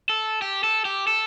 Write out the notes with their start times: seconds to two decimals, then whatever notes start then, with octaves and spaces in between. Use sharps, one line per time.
0.09 A4
0.42 G4
0.64 A4
0.85 G4
1.07 A4